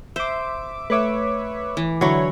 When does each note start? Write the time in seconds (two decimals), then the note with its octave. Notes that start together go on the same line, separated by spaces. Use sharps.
0.16 C5 E5 D6
0.90 A3 B4 C#5 E5 D6
1.77 E3
2.01 D3 F#3 E4 C#5